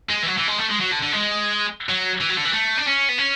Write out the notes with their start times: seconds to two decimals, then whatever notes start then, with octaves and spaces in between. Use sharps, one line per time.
0.10 G#3
0.22 E3
0.26 F#3
0.37 E3
0.47 G#3
0.58 A3
0.70 G#3
0.80 F#3
0.91 D3
1.02 D3
1.12 G#3
1.89 F#3
2.21 E3
2.30 F#3
2.37 D3
2.45 E3
2.53 A3
2.78 D4
2.86 C#4
3.09 B3
3.18 C#4